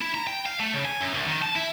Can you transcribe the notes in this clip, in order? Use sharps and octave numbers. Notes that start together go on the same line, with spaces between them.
E4
A#5
G5
F5
A3
C#3
G#5
F#2
C2
D#3
A5
E4